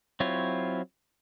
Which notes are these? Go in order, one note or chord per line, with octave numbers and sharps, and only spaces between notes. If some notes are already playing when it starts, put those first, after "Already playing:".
F#3 C4 E4 F4 C#5